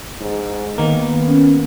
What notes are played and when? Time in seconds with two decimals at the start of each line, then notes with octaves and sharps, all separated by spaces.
0.21 G#2
0.78 D#3 A#3 B3
1.27 C#4